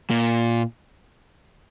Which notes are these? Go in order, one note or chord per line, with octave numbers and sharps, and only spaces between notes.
A#2